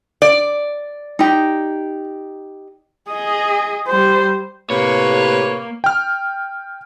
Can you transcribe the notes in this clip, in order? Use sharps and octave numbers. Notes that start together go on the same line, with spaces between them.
D5
D#4 G4
G#4 D#5
G3 C5
A2 C3 A#3 B4 C#5
G5 F6